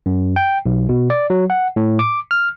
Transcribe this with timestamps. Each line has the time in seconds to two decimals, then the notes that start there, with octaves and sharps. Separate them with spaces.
0.06 F#2
0.36 G5
0.66 B1
0.89 B2
1.10 D5
1.30 F#3
1.50 F#5
1.76 A2
1.99 D6
2.31 F6